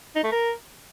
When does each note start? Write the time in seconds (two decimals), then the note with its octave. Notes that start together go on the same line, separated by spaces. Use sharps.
0.16 D#4
0.24 A3
0.32 A#4